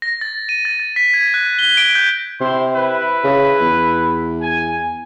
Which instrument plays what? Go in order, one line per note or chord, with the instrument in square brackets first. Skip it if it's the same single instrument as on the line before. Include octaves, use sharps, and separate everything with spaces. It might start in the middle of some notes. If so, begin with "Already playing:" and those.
[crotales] A#6
A6
D#7
A6
A6
B6
G#6
F#6
G7
D7
G6
[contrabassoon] C3 [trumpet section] E4 C5 C6
[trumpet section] E4 B4
[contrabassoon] C#3
E2
[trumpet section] G#5